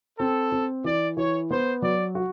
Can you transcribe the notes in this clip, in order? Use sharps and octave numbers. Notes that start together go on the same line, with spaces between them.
C4 A4
C4
E3 D5
E3 C#5
B3 C5
F#3 D5
F#4